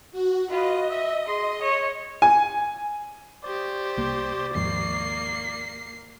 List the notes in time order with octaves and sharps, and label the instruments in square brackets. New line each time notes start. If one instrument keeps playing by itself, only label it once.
[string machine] F#4
[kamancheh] F4 B4 [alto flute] F#4 [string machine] D#5
[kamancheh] E5
[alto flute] G#4 [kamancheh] C6
[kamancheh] C#5
[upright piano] G#5
[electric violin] G4 C5 [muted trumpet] D5
[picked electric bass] C2 A#3
[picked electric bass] D#2 G#2 F3 [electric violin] A#3 C7